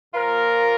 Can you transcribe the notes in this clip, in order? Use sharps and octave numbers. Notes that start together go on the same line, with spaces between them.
A#2 F3 A#3 F4 A#4